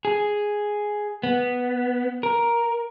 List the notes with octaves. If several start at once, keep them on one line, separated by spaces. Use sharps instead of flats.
G#4
B3
A#4